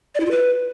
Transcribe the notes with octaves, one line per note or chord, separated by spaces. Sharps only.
D5
E4
F4
B4